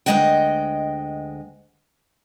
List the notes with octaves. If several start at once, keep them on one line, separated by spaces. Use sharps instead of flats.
D2 F#3 G#3 D#5 F#5 G5